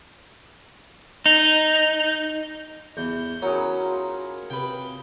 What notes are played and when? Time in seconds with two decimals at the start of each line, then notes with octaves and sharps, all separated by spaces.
1.26 D#4
2.97 E2 G6
3.42 F#3 C#4 E4 G#4 A#4
3.84 F4
4.50 C3 B4 G5